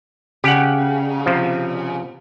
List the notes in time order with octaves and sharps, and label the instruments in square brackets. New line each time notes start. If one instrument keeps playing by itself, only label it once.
[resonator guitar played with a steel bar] C#3 [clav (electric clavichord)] G4 F#5
[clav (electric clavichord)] C3 F3